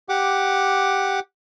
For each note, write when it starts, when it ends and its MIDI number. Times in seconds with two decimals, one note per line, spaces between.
0.09 1.20 67
0.09 1.20 78
0.09 1.20 86